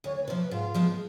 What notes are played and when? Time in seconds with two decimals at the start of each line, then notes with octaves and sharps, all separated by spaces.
0.04 D2 C#5
0.16 C#5
0.23 B4
0.28 C3 F3 C5
0.40 B4
0.51 G#2 F4
0.74 F3 G#3 B3